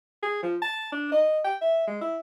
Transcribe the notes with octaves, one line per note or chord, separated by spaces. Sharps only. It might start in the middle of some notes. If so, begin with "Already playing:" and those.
G#4
F3
A5
D4
D#5
G5
E5
G#3
E4